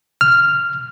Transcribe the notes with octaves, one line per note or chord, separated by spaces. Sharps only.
F6